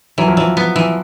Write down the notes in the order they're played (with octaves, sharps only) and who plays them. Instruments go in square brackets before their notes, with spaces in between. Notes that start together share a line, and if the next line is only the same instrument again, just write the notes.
[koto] E3 [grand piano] F#3
[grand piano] F3
[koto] E3 [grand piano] F#3
[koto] B3
E3